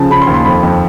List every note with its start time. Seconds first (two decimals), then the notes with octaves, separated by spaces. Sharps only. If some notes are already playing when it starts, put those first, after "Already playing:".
Already playing: C#3 F3 A5
0.10 C#3 B5
0.22 C6
0.27 D#2
0.34 C6
0.45 F2 B5
0.63 F2